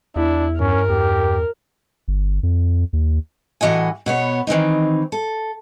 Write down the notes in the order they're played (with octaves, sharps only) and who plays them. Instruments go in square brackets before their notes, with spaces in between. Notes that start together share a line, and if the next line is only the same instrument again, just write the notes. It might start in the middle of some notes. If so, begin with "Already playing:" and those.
[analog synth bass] E2 [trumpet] D4 [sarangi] E4
[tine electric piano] G2 [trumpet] C#4 [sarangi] A#4
[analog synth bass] E2 [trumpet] G4
[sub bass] G1
F2
D#2
[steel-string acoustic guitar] A2 E3 F#4 D#5 G#5
B2 B3 C#5
D#3 E3 C4 D#4
A4